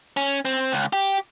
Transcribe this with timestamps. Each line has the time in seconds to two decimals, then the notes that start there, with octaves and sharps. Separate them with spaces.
0.17 C#4
0.45 C4
0.72 C#2
0.93 G4